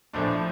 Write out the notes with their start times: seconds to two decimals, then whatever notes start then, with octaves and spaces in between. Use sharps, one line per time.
0.13 A#1 A2 F3 A3 D4